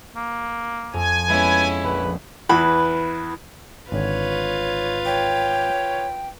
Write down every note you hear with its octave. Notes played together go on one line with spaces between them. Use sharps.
A#3
F2 G#5
G#3 B3 C#4 E4 B4
A#1 B4
E2 E3 B4
G#1 D3 F4 B4 C#5
C#5 G5